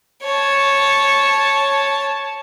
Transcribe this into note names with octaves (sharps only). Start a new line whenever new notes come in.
C#5 A5